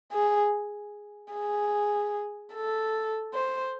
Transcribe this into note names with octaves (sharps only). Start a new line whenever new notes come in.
G#4
G#4
A4
C5